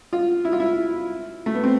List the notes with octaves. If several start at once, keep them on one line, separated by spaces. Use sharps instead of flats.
F4
E4
F4
E4
A3
B3
C4